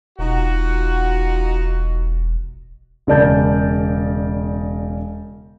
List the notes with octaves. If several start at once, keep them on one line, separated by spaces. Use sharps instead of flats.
E1 D#4 F4 F#4
E1 C#3 A#4 D5 A5 G6